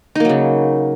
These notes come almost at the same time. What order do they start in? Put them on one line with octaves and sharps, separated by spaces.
D#4 A#3 F#3 C#3